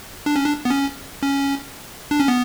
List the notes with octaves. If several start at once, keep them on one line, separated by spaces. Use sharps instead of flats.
D4
C#4
D4
B3
C#4
C#4
D4
C#4
B3